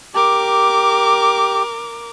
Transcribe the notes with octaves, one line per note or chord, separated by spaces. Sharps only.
G4 A#4 D6